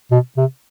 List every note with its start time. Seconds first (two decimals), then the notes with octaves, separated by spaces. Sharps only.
0.11 B2
0.37 C3